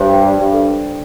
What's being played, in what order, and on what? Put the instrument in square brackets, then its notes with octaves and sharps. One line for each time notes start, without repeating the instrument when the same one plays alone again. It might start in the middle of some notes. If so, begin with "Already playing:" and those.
Already playing: [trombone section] G2 [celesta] C5
[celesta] G5
D5
[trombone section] G2 [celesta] D4
[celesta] A4